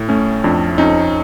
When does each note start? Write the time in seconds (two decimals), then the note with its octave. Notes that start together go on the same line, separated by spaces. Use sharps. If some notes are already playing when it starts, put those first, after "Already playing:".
Already playing: A2
0.09 A3 C#4
0.44 F2 D4
0.78 F2 C#4 D#4